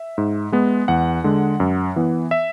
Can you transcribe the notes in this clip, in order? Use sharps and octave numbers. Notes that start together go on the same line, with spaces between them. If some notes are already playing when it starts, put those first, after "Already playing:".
Already playing: E5
G#2
G#3 B3
E2 F#5
D3 G#3
F#2
E3 B3
E5